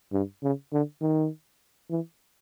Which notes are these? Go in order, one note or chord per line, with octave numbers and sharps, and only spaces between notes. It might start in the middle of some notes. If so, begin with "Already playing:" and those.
G2
C#3
D3
D#3
E3